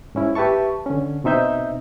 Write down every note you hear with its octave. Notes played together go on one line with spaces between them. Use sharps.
G#2 C#4 E4
G4 B4 E5 A5 C#6
D3 C#4
B2 C4 D#4 E5 G6